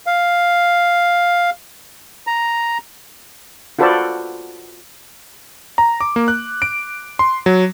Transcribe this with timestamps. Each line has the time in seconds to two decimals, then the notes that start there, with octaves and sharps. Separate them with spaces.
0.07 F5
2.27 A#5
3.79 F4 F#4 A4 B4 C5 D5
5.78 A#5
6.01 D6
6.16 A#3
6.28 F#6
6.62 D7
7.19 C6
7.46 F#3